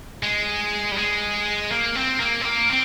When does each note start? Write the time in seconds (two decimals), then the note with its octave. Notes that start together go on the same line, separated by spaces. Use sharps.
0.23 G#3
0.92 G3
0.98 G#3
1.71 A#3
1.95 C4
2.20 A#3
2.41 C4
2.45 A#3
2.70 C4